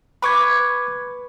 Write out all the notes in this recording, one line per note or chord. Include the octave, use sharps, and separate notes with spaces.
B4 B5 C#6 D6 G#6